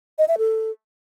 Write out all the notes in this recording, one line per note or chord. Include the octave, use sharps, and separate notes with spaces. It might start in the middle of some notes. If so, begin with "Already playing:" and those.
D#5
E5
A4